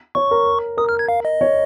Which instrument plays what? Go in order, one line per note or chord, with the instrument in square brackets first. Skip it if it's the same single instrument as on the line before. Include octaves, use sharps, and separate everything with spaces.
[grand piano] C#5 [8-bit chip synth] C#6
[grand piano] A#4
[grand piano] A#4 [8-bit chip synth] D#6
[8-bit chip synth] F6
G#6
F5
D#5
[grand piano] C#5